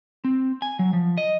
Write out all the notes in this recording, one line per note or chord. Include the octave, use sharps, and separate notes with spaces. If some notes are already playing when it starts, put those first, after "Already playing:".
C4
G#5
F#3
F3
D#5